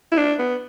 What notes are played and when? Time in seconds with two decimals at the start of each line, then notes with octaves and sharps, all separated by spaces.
0.12 E4
0.17 D4
0.39 B3